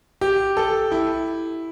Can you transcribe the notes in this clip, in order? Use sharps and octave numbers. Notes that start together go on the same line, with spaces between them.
G4
A4
E4